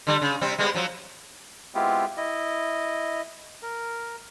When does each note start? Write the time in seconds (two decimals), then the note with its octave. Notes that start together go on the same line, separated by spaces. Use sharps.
0.07 D3 G3
0.21 C#3
0.41 C3 G3 C4
0.58 G3 G#3 B3
0.75 F3 F#3
1.75 G#3 B3 C4 E4 F4 G4
2.17 E4 D#5
3.62 A#4